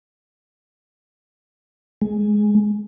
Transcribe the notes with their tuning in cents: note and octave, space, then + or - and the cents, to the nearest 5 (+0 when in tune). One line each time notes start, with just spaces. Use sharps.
G#3 +10